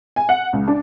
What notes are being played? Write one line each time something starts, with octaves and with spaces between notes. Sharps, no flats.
G#5
F#5
C#2
D4